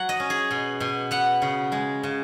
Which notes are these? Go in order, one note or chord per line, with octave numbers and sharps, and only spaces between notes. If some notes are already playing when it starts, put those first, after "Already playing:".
Already playing: F#3 F#5
D#5
C#4
G#4
B2
B2
B3 F#5
C#3
G#3
C#3